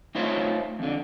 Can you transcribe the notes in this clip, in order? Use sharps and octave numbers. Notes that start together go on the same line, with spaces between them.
A3 D#4 F4 C5 C#5 E5
F2 D3